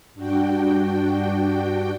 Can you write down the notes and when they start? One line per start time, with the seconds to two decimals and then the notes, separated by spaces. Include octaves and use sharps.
0.14 G2 D4 F#4 G5